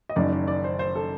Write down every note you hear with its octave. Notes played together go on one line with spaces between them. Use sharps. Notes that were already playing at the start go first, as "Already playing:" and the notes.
D#5
F#1 F#2 D#3 D5
D5
D5
C5
C5
A4